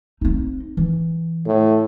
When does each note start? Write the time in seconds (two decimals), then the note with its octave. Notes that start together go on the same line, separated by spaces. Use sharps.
0.21 C4 D#4
0.77 E3
1.47 A2